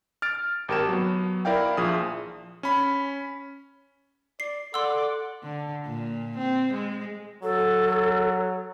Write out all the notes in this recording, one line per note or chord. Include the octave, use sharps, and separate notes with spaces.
F6 A6 D7
G#1 G4 A#4 A5 E7
F#3 B3
E4 A#4 D5 F5 G5
A#1 F3 G#4 D#6
C#4 B5
D5 C7
A4 D5 F#5 C6 E6
D3
A#2
C4
G#3
F#3 A4